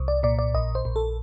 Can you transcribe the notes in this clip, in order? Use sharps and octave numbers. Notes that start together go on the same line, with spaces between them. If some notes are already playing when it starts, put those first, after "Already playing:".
Already playing: C2
D5
A#2 D5
D5
A#1 D#5
C5
A#1
A4